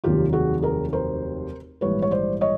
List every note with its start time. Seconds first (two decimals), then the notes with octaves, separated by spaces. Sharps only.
0.04 F1 D#2 D#3 F#3 F4 G4
0.33 F#4 G#4
0.62 G#4 A#4
0.93 A#4 C5
1.81 A#1 G#2 E3 G3 B4 C#5
2.02 C#5
2.11 C5 D5
2.41 C#5 D#5